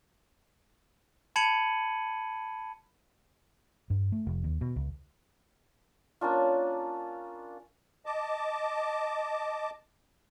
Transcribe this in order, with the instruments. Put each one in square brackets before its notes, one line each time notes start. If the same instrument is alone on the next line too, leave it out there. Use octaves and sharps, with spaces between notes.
[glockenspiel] A5 B5 G#6 C#7 D#7 F#7
[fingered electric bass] G2
A3
F1
D#2
B2
C#2
[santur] A#3 C#4 D4 F4
[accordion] D#5 A5 D6